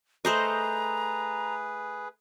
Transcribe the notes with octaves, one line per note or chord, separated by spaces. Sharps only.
A3 G#4 B4 C5 D#5 A#5